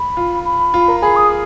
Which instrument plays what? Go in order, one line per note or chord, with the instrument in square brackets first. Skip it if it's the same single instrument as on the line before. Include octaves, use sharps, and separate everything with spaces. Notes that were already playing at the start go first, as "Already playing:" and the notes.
Already playing: [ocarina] B5
[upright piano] F4
[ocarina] B5
[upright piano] F4
A#4
[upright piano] G#4 [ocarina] B5
[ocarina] D#6